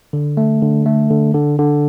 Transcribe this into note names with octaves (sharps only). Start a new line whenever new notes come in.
D3
A3
D3
A3
D3
D3
D3